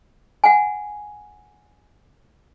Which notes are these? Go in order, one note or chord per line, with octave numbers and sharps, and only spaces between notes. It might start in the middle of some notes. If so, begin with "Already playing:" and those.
F#5 G#5